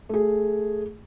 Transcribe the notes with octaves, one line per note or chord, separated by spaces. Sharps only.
A3 G#4